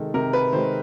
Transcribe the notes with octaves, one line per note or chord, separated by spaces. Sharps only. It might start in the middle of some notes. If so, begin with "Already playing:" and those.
Already playing: C3 D#3 G#3 A4
C3 A#4
B4
D#3 G#3 C5